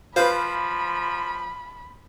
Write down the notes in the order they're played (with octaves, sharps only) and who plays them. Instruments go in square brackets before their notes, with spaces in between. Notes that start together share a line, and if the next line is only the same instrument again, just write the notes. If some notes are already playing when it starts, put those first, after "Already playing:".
[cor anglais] F3 [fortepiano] F4 B4 [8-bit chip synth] C5 F5 G6 [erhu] B5